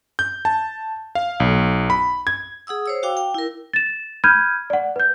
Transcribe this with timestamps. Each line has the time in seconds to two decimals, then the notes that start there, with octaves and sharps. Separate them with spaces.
0.19 G6
0.45 A5
1.15 F5
1.40 B1
1.90 B5
2.27 G#6
2.67 G#4 F#5 D#6 E6
2.86 C5 C#5 E6
3.03 F#4 F5 G5 D6
3.17 G5
3.34 E4 A#4
3.73 A6 E7
4.24 B5 F6 G6 G#6 D#7
4.70 D5 F#5
4.96 B4 G6